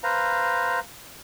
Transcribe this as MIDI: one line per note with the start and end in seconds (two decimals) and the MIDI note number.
0.03 0.80 71
0.03 0.80 72
0.03 0.80 77
0.03 0.80 82